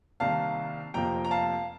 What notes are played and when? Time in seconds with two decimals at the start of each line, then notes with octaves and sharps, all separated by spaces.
0.20 C2 C3 D#3 A#3 F5 A5
0.94 F1 F2 C3 F3 A#3 G5 A#5
1.25 A#5
1.31 F5 A5